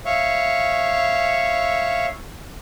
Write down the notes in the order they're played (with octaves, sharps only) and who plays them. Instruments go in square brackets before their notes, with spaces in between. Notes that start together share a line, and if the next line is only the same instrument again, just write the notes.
[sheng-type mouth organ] C#5 E5 F5 C#6